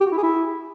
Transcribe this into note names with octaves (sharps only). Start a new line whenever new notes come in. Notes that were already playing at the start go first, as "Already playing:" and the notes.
G4
F#4
E4
G#4
E4